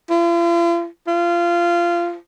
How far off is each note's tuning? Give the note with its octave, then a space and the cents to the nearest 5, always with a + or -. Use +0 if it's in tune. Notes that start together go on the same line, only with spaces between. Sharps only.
F4 -45
F4 -20